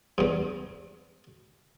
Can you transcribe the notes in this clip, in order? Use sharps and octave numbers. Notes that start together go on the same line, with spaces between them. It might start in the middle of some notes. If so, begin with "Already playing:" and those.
E2 G2